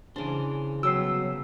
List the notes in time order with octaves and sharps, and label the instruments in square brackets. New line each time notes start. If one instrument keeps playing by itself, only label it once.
[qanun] C#3 D4 [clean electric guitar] E3 C5
[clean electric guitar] C2 F#3 B3 [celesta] F#4 C#5 C7 [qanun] G5 [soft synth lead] E6